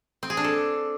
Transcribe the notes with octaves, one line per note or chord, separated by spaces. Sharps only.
C4
G#4
D4
A4